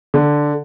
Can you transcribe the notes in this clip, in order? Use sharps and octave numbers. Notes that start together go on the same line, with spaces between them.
D3